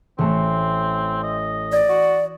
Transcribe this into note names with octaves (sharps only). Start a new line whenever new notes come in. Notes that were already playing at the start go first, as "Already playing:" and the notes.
A1 A3 C4
D#5
D5 D#6 G#6 A#6
F#4